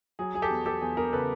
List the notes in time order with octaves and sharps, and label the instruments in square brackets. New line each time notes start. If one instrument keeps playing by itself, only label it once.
[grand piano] F#3 G#4
F#3 G#4
G4 A4
E2
E2 G4 A4
E2 G#4
E2 G#4 A#4
C#3 A4 B4